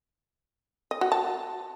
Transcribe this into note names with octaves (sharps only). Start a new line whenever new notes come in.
D#5
F#4
A5